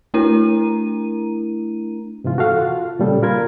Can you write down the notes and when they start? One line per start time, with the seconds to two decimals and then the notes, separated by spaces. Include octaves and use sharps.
0.14 A3 D4 E4 A#4 A#5 D#7
2.24 G#2 C3 E3 F4
2.38 F#4 A4 F5 F#5
2.59 F4
2.99 A#2 C#3 G3 A4
3.23 F4 A#4 B5 G#6